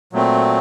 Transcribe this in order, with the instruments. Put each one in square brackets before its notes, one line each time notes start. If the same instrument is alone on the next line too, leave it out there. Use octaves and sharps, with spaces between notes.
[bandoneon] A#2 F#3 A3 C4